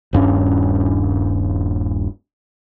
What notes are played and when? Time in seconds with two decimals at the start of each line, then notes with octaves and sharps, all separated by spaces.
0.13 D#1 G2 C#4